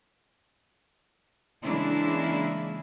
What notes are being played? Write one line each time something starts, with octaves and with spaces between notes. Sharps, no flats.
C#3 E3 G#3 A#3 D4 E4